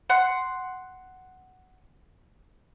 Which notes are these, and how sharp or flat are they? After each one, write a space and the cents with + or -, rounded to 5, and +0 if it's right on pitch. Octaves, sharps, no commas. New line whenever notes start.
F#5 +5 C6 +0